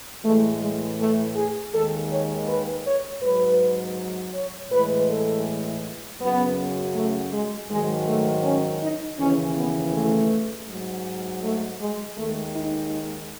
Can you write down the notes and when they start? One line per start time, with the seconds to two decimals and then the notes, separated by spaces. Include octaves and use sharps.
0.24 A2 E3 G#3 A3
0.61 G#3
0.99 A3
1.36 G#4
1.73 D#2 D#3 G#3 A4
2.11 C#5
2.48 B4
2.85 C#5
3.22 G#2 F#3 B4
4.34 C#5
4.71 A2 E3 G#3 B4
5.09 A4
6.21 F#2 C#3 F#3 B3
6.95 A3
7.32 G#3
7.70 G#2 D#3 F#3 G#3
8.07 A3
8.44 C#4
8.81 D#4
9.19 D#2 C#3 E3 C#4
9.56 B3
9.93 A3
10.68 G#2 F#3
11.42 A3
11.80 G#3
12.17 D#2 D#3 G#3 A3
12.54 D#4